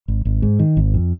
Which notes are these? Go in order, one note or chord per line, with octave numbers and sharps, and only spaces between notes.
G#1
G#1
G#2
D#3
G#1
F2